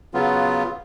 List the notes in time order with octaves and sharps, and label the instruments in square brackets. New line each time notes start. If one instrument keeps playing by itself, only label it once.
[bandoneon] C#3 F#3 B3 F4